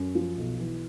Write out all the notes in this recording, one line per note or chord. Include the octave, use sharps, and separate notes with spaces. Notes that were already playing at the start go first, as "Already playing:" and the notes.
Already playing: F#2
F3
B1
E3